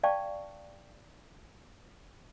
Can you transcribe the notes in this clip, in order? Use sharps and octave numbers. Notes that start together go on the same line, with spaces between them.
D5 F5 G5 A5 C#6